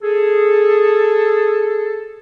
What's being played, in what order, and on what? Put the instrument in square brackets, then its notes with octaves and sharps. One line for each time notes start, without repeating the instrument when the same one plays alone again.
[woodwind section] G#4 A4